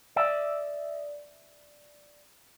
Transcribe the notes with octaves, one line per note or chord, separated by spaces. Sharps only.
D5 E5